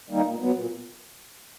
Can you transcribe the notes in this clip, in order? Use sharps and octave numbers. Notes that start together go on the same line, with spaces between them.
D#3 G3 A#3 D#4
A#2
F#3 B3
A#2